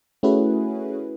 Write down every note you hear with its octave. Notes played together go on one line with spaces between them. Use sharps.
A3 C#4 E4 F#4 G#4 B4